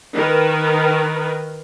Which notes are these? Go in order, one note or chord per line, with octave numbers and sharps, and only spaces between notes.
D#3 A#4 B4